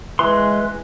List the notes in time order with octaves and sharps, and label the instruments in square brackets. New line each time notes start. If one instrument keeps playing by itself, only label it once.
[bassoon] E3 [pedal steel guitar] G#3 C6 [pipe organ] B4